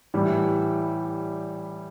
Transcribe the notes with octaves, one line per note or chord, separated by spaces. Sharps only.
A2 E3 G3